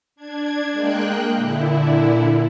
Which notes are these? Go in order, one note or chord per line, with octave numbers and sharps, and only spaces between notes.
D4 G#6
G#3 A#3 G5 F#6
A#2 D3 E4